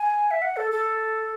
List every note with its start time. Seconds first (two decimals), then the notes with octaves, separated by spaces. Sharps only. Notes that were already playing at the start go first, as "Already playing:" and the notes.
Already playing: G#5
0.31 E5
0.42 F#5
0.57 A4
0.72 A4